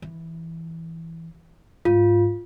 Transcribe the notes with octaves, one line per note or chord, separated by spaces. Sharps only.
E3
G#2 F4